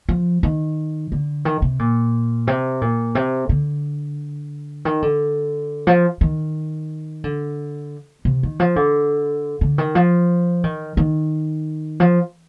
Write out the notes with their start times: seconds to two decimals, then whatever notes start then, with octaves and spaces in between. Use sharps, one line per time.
0.09 F3
0.43 D#3
1.12 D3
1.45 D#3
1.62 C3
1.79 A#2
2.47 C3
2.81 A#2
3.15 C3
3.49 D3
4.85 D#3
5.02 D3
5.87 F3
6.21 D#3
7.24 D3
8.25 C3
8.43 D#3
8.60 F3
8.76 D3
9.61 D3
9.78 D#3
9.95 F3
10.64 D#3
10.97 D#3
12.00 F3